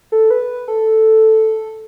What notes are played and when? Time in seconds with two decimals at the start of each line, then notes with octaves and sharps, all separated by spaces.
0.12 A4
0.30 B4
0.68 A4